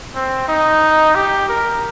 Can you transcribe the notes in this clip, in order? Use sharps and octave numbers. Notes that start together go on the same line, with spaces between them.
C4
D#4
G4
A#4